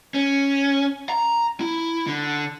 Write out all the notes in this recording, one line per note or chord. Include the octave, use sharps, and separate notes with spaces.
C#4
A#5
E4
D3